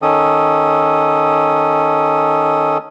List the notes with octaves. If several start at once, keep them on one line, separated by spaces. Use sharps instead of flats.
D#3 C#4 A4 D#6